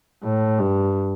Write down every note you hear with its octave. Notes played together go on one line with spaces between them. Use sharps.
A2
G2